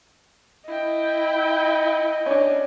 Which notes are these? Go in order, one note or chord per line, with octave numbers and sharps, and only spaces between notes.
E4 D#5 G5
C#4 D4